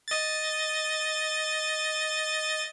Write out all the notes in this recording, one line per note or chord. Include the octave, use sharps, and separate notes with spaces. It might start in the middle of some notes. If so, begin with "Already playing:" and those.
D#5 A6